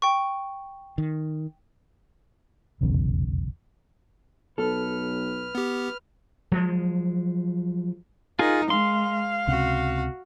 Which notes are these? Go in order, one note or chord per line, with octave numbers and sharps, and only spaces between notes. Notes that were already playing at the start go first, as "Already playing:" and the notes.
G5 C#6
D#3
F1 B1 E2 C#3
B1 A4 B4 F6
B3 G4
F3 F#3 G#3
D#4 F4 G#4 A#4
G#3 F5 C6
C#2 C3 C#4 F#4